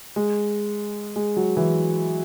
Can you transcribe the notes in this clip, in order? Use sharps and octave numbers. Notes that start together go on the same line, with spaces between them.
G#3
G#3
F#3
E3